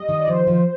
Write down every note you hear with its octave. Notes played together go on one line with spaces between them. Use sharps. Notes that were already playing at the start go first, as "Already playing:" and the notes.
Already playing: G3 D#5
D#3
D5
F3 C5
F3